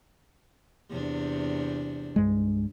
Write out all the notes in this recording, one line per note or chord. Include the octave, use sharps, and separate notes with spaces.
E2 C3 D4
C2 G2 G#3